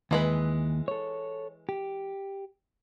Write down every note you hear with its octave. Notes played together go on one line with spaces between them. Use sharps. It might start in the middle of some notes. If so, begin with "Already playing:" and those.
D#2 E3 G#3 B4
A4 C#5
G4